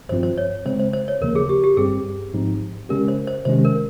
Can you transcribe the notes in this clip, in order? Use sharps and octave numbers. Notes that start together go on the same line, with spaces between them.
G#1 G2 F3 C4 F4 C5
C5
C#5
C#3 G#3 C4 C5
C5
C5
C#5
D#2 C#3 F3 A#3 A#4
G#4
G4
G4
G1 G2 G3 C4 G#4
G#1 G#2 F3 C4 D#4
C#3 G#3 C#4 G4 A#4
C5
C5
C3 D#3 G#3 C#4 G4 C5
A#4